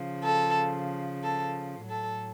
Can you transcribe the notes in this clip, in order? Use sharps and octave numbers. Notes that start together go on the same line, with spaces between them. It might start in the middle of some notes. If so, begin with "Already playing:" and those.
Already playing: C#3 F3
A4
A4
A2 F#3 A4